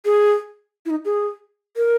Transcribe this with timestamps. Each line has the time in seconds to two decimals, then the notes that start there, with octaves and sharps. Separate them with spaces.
0.05 G#4
0.86 E4
0.90 D#4
1.05 G#4
1.77 A#4